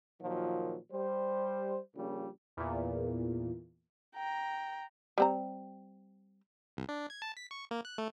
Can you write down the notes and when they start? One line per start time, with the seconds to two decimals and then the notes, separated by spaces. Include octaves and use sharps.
0.21 A#2 D#3 F3 F#3
0.91 G3 C5
1.95 A#1 A#2 C#3 G3
2.57 E2 A#2
4.15 G5 A#5
5.18 G3 C4 A#5
6.77 C2
6.89 D4
7.10 G#6
7.22 A5
7.37 B6
7.51 C#6
7.71 A#3
7.85 F#6
7.98 A3